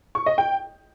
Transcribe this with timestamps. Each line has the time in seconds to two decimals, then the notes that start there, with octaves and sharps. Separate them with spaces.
0.15 C#6
0.26 D#5
0.38 G5